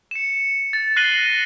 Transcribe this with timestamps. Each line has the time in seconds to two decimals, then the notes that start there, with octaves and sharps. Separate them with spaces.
0.11 C#7 E7
0.73 A6
0.96 F#6 A#6 C7 D#7 F#7 G7
1.30 A#6